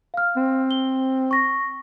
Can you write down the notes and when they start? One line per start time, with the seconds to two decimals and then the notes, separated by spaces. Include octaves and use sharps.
0.14 F5 F6
0.36 C4
0.71 G7
1.31 C#6 A#6